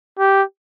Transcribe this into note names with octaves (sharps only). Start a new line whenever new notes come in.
G4